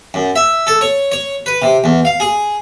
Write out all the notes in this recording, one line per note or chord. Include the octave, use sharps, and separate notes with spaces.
F#2
E5
A4
C#5
C#5
B4
C3
E2
F5
G#4